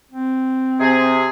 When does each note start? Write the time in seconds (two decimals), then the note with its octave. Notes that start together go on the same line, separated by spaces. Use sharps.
0.11 C4
0.79 C3 G#4